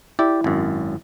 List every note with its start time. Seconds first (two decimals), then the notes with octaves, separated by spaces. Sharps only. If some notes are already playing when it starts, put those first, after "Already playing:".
0.19 E4 G4 D5
0.44 G#1 F#2